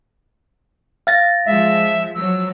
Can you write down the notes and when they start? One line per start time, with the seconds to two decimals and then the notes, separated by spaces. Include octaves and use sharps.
1.07 F5 A6 A#6
1.45 F3 G#3 E5
2.15 F3 F#3 E6